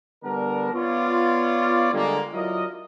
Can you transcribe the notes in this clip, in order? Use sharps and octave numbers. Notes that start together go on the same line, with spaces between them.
D3 G3 B3 D4 A#4
B3 F4 C#5 D5
D3 G3 G#3 A#3
F#3 E4 F4 A#4 D5 D#5